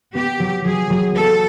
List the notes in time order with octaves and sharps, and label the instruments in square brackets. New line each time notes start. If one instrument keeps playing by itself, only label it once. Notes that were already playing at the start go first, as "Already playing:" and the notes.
[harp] B3 [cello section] G4
[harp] F#3
[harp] F#3 [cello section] G#4
[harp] F#3
[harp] B3 [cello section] A4